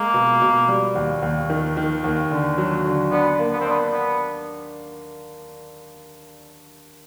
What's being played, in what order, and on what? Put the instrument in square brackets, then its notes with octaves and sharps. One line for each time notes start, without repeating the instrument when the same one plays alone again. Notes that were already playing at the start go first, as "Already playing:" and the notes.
Already playing: [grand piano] G#3 [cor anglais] A#3
[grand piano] B2
B2
G3
D#2
D#2
D#3
D#3
D#2
D3
F#3
D3
[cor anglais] B3 [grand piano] D4
[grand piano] A#3
[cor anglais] B3
C4
[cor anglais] B3 [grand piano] D4
[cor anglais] B3